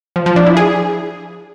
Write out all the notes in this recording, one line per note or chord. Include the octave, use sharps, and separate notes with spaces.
F3
F3
D4
E4
G#4